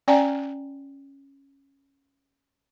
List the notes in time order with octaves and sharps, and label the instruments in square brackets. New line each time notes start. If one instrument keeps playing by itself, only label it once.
[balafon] C#4 D5 G5 G#5 A#5